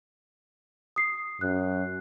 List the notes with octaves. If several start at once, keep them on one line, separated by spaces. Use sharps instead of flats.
D#6 C7
F#2 F#6